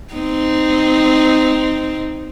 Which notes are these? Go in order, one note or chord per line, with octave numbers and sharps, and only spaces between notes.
C4 D#4